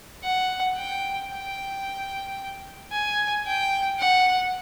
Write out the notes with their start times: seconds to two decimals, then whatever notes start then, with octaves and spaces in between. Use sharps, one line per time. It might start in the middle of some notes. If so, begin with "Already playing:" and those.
0.23 F#5
0.77 G5
1.30 G5
2.92 G#5
3.46 G5
3.99 F#5